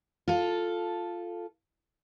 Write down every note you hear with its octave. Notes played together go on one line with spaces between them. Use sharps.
F4 A4